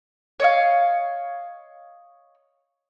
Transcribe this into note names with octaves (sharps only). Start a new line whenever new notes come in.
C#5 D#5 F5